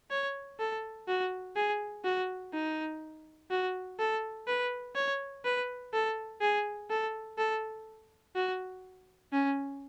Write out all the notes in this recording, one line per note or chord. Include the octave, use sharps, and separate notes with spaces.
C#5
A4
F#4
G#4
F#4
D#4
F#4
A4
B4
C#5
B4
A4
G#4
A4
A4
F#4
C#4